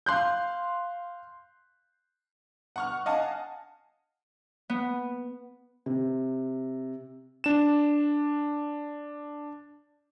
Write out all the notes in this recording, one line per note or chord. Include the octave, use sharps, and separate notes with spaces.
F5 C6 F#6 G6
F#5 C#6 F6
D#5 F5 F#5 G#5 A5
B3
C3
D4 E7